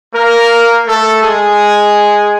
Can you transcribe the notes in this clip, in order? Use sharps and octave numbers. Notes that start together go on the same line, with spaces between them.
A#3 A#4
A3 A4
G#3 G#4